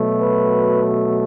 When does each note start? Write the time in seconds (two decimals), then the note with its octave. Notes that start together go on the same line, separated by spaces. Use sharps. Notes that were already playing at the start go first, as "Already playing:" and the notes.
Already playing: B2 F#3 A3
0.21 B4